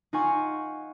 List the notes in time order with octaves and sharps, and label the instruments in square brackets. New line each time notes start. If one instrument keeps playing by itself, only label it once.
[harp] D#4 F4 F#5 G#5 C#6